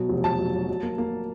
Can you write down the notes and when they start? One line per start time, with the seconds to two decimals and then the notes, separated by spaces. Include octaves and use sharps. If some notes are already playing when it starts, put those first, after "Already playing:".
Already playing: B2 F#3
0.09 F1
0.24 F#3 A5
0.39 F#3
0.53 F#3
0.68 F#3
0.83 A#3
0.98 A#3